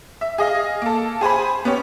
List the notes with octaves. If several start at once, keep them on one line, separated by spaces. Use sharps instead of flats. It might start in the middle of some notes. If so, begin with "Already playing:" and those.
E5
G#4 D#5 F5
A#3 A4
G#4 C5 G#5 B5
B3 C#4 G4 C#5